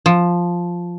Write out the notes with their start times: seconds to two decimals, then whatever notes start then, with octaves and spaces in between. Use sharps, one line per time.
0.06 F3